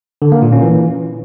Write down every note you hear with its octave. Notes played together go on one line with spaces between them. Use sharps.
D3
A#3
A#2
C#4
E3